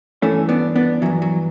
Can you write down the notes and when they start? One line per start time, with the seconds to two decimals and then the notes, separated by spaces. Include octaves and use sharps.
0.22 G2 E3 A3 C#4
0.49 B3 D4
0.76 B3 D4
1.02 G2 E3 F#3
1.22 F#3